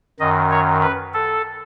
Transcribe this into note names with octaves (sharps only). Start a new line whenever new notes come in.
F#2 D#3 D#5
C#5
B4
A4